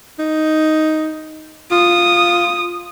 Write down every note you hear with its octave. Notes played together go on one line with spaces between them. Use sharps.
D#4
F4 D#6